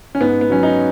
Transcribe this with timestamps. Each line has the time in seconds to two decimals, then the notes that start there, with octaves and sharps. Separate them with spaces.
0.15 C#4
0.20 G#2 B3
0.41 B3
0.50 F#3 C#4
0.63 D#4